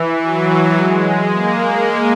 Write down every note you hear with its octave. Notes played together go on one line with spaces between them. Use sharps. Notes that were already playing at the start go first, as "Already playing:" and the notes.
Already playing: E3
F#3
G#3
A#3